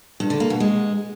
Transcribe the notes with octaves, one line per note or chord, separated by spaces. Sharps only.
G2
D3
A#3
B2
G#3